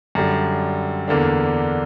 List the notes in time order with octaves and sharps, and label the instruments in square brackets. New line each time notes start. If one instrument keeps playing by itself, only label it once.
[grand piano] F#2 D3 G3
E2 D3 A#3 D4